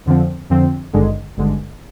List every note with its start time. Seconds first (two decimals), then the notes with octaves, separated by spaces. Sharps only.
0.06 F2 D3 F3 C4
0.50 F2 D3 F3 C4
0.93 G#1 G2 D3 G#3
1.37 G#1 G2 D3 G#3